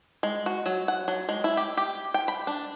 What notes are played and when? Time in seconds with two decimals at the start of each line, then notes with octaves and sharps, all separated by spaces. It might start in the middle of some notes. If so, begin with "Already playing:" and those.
0.23 G#3
0.46 F#4
0.66 F#3
0.88 F#5
1.08 F#3
1.29 G#3
1.44 E4
1.57 G4
1.77 G4
2.14 G5
2.28 B5
2.47 D4